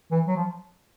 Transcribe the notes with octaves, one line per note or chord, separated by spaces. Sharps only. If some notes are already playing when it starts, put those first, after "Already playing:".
E3
F#3
F3